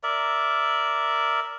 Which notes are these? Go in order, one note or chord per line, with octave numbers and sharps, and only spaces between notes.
A#4 D5 E5